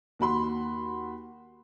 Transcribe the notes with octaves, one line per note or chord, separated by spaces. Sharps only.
D#2 F#4 B5 C6